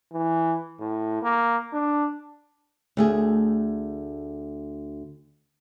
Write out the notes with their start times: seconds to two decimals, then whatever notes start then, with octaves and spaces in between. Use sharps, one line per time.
0.13 E3
0.80 A2
1.23 A#3
1.73 D4
2.97 D2 A3 G#4